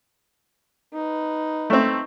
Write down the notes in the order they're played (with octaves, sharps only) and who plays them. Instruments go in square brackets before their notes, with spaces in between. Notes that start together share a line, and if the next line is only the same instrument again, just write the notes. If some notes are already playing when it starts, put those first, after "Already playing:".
[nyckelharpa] D#4 B4
[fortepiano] A3 C4